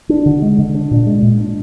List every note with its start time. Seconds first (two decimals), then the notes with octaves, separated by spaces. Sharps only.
0.09 D4
0.26 D3
0.42 G#3
0.59 D3
0.75 D4
0.91 A#2
1.06 G#3
1.23 A#2
1.40 D4